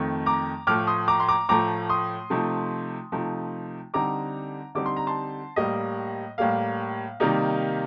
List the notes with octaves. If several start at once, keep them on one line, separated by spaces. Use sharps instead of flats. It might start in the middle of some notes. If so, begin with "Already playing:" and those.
Already playing: F2 D#3 A3 C4
A#5 D6
A2 F3 A3 D6 F6
C6 D#6
A#5 D6
C6
A#5 D6
A2 F3 A3 A#5 D6
C6 D#6
C3 F3 A3 D#4
C3 F3 A3 D#4
D3 G3 C4 D#4 A#5 D6
D3 G3 C4 D#4 D6
C6
A#5
A5 C6
A2 G3 A#3 D#5
A2 G3 A#3 F5
C3 D#3 G3 A#3 D#4